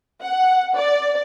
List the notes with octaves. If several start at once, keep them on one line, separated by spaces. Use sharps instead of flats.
F#5
D5